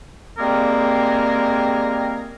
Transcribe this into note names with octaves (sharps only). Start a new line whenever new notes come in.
G3 G#3 A#3 C4 G#4 A#4